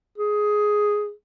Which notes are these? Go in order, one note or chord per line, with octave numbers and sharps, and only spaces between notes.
G#4